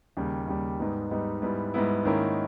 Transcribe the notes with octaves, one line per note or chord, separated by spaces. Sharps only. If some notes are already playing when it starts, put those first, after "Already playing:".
D#2 C#3 G3
D#2 C#3 G3
G#2 G3 B3 D#4
G#2 G3 B3 D#4
G#2 G3 B3 E4
G#2 G3 B3 E4
G#2 D#3 A#3 C#4 E4